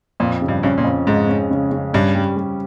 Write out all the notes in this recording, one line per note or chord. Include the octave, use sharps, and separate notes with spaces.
F2 A#2
C#3
G2
G2 C#4
A#2
F2
G#2 G#3
C#4
C#3
C#3
G2 C#4
G3
G3